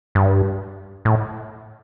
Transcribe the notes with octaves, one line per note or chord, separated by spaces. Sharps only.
G2
A2